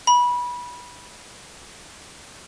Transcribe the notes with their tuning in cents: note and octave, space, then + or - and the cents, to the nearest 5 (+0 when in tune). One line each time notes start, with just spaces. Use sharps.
B5 -20